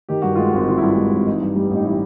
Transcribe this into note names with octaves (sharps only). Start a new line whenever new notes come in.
D#3 G4
G2 F#4
G#3 F4
F#4
G#1
D#3 F4
G2 E4
F4
G#3
G#1
E3 D#4
G2
G3
A1 D#4
E3 E4